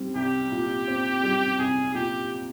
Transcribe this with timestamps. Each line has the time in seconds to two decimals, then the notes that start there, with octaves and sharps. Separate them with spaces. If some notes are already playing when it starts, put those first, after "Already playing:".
Already playing: G3 C4
0.15 C2 G4
0.52 A#2
0.88 C4
1.23 G3
1.58 C2 G#4
1.94 A#2 G4